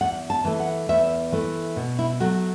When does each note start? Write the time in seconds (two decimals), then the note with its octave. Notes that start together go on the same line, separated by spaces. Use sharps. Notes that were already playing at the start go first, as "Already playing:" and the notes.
0.01 E2 F#5
0.30 A5
0.45 E3 A3
0.60 F#5
0.89 E2 E5
1.32 E3 A3
1.76 B2
1.99 E4
2.20 F#3 A3 F#4